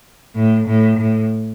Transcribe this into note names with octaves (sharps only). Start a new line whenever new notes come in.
A2
A2
A2